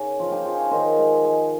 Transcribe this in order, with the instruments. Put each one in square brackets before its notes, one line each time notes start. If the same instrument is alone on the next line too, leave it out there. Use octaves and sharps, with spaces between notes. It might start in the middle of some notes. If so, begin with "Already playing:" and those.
Already playing: [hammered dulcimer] C#3 C#4 D#4 A#4
F3 F4
D#4 G4
F3 F4 G#4
C#5 F5
D#3 C5 D#5
G#3
G#3